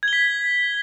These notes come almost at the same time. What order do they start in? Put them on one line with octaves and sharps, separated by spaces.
G#6 G7 B6